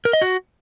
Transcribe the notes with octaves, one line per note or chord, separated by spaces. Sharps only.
A#4
D#5
F#4